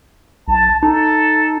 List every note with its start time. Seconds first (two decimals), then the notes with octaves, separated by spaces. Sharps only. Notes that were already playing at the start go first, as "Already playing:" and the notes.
0.48 B1 A5
0.83 D#4 A4